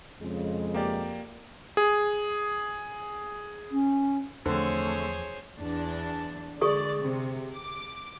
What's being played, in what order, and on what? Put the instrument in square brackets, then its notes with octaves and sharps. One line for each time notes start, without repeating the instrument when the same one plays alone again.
[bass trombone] F2 [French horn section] C#3 G#3
[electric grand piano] A#3 G4 D5
G#4
[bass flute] C#4
[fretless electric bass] E2 F3 [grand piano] D3 C4 [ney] A3 [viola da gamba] G#4 C5 C#5
[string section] E2 D4
[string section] D3 G#3 D5 [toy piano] G#4 C#6 D#6
[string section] C3
D6